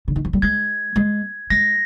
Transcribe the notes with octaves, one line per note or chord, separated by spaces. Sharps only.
D3
D#3
F3
G3
G#3 G#6
G#3
G#3 A#6